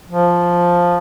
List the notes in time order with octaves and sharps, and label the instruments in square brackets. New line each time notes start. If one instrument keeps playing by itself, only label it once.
[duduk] F3